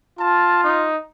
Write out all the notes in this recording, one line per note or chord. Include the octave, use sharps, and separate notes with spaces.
F4 A5
D#4